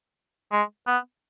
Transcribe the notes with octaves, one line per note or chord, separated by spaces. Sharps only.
G#3
B3